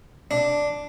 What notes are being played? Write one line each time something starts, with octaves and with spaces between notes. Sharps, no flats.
D4